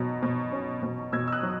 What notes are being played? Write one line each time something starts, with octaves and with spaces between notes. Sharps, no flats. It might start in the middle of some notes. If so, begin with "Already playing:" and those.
Already playing: B2 F#3
B2
C#4
B2
B2 E6 G#6
E6
D#6 F#6
F#3